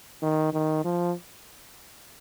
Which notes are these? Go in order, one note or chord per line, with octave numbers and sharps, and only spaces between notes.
D#3
D#3
F3